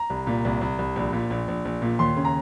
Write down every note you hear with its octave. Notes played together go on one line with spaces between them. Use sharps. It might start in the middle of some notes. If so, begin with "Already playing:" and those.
Already playing: A#5
C2
A#2
C2
C2
C2
A#1
A#2
A#1
A#1
A#1
A#2
D#2 C6
C#3
A#5